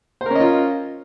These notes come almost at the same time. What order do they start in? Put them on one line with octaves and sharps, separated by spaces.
C5 A#4 C#4 D#5 F4